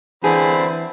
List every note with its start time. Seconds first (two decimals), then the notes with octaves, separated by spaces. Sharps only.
0.24 D3 E3 C4 G#4 B5